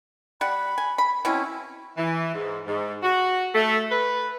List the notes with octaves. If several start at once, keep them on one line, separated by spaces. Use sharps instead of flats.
G3 F#5 B5
G#5
B5
B2 C4 C#4 E4
E3
G#2
G#2
F#4
A3
B4